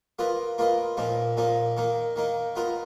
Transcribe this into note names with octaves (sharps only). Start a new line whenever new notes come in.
A#3 F4 B4 D#5
A#3 F4 B4 D#5
A#2 F3 A#3 D#4
A#2 F3 A#3 D#4
D#3 A#3 D#4
D#3 A#3 D#4
B3 F4 A#4 D#5